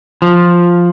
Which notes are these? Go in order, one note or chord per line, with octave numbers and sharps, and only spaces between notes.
F3